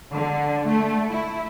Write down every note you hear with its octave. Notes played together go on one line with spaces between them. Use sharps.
D3
A3
E4